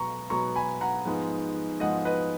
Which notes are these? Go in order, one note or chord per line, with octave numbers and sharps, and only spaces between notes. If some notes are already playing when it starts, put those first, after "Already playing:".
Already playing: B2 F#3 B3 A#5 C#6
B2 F#3 B3 A#5 C#6
G#5 B5
F#5 A#5
G#2 F3 G#3 B3
G#2 F3 G#3 B3 D#5 F#5
B4 D#5